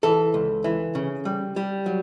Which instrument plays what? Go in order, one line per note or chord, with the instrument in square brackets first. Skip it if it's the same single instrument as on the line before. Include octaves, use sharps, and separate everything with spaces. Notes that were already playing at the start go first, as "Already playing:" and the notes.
[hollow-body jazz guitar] E3 A4
C#2
E3
C#3
G3
G3
F#3